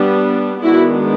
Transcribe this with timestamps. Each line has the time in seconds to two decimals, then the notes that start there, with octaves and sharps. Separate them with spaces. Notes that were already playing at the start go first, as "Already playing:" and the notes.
Already playing: G3 B3 D4
0.63 D#3 G#3 B3 D4 E4 F#4